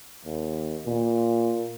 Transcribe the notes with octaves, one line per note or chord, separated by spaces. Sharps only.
D#2
A#2